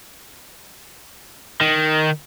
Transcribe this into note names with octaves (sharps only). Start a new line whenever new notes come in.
D#3